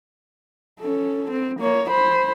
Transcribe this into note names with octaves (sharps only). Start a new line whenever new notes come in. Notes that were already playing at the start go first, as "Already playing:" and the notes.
C#4 A4
C4
A#3 C#5
C5 B5